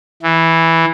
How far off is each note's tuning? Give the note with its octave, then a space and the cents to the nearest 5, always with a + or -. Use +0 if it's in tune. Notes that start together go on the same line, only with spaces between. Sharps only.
E3 -5